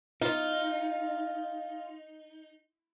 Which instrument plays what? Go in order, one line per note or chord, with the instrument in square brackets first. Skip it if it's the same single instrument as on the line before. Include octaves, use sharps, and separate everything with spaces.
[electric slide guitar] D#4 [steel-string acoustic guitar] F4